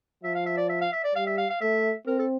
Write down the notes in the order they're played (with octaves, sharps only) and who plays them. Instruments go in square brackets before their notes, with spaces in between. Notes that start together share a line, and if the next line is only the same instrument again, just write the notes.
[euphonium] F3 [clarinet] E5
[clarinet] F5
E5
D5
E5
F5
E5
D5
[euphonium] G3 [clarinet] F5
[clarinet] E5
F5
F5
[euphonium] A3 [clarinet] E5
[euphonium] C4 [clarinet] A#4
[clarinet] A4